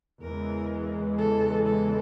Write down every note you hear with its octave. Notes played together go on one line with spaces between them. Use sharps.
E2 C#3 E3 G#3 A#4
A4
A4